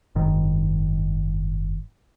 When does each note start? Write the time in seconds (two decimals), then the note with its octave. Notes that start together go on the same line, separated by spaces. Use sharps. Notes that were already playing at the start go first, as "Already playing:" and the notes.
0.15 F#1 G#2 D#3